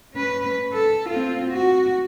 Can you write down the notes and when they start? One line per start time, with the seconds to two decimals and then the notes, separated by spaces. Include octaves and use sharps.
0.13 C#4 B4
0.73 A4
1.09 C4 F4
1.50 F#4